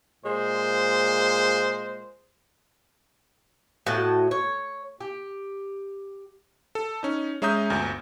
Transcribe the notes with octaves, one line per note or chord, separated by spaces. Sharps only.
A#2 G#3 C5
A2 F#4 D#5 A5
C#5
G4
A4
C#4 D#4
G#3 C#4 E5 A#5 D#6 G6
G1 D2